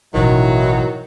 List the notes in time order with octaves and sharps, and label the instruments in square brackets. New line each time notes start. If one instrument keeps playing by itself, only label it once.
[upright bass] A1 B2 [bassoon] D#3 [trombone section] E3 D#4 E4 [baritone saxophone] F#3